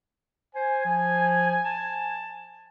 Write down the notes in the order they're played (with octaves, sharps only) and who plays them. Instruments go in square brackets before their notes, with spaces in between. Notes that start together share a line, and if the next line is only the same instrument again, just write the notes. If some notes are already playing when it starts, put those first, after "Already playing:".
[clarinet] C5 [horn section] G#5
[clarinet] F3
A5